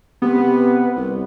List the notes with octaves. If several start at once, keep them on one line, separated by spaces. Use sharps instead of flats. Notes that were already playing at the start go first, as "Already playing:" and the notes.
C3 B3
C2